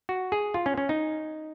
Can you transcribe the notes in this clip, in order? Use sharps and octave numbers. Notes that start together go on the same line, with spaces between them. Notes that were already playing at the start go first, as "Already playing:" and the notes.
F#4
G#4
F4
C#4
C#4
D#4